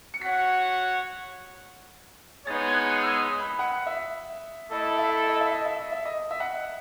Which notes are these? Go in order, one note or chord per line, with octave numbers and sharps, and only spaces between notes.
C#7
F#4 C#5 F#5 B6
G#3 B3 D#4 G#4 C#5 A6
G#6
F#6
E6
D#6
B5
F#5
E5
A3 E4 A4 D#5
E5
D#5
E5
D#5
E5
D#5
E5
D#5
E5
F#5